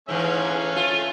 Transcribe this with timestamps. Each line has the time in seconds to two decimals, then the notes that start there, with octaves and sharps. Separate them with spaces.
0.09 G#2 E3 A3 C#4 F5
0.76 F4